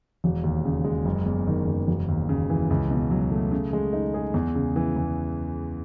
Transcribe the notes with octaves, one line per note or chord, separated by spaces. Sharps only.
E1
D#2
C#3
G#3
F#1
E2
D#3
F#1
E1
D#2
C#3
E3
C#2
B2
F#3
A3
C#3
G#3
D#4
G#4
E2
C#3
E3
E2